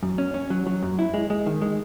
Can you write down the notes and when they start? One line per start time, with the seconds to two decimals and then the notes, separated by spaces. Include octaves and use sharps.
0.03 F#2
0.18 C#4
0.34 C#4
0.50 F#3
0.66 F#3
0.82 F#2
0.99 E4
1.14 G#3
1.30 G#3
1.46 D#3
1.62 G#3